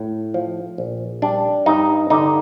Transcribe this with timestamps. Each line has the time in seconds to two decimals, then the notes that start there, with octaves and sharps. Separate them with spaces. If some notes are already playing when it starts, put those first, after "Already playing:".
Already playing: A2
0.34 F3
0.78 A#1
1.22 G3 D4
1.66 G2 D#4
2.10 D3 D#4